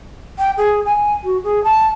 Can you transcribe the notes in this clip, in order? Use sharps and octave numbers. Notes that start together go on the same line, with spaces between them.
G5
G#4
G#5
F#4
G#4
A5